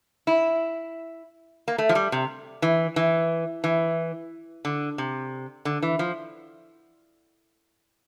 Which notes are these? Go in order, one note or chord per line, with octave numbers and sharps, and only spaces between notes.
E4
A#3
A3
F3
G3
C3
E3
E3
E3
D3
C3
D3
E3
F3